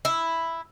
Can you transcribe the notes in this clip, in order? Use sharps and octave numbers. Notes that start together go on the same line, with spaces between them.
E4